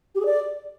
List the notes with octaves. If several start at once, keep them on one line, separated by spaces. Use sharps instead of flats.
G4
G#4
D5